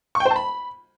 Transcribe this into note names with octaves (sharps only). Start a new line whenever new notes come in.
C#6
G5
C5
A5
B5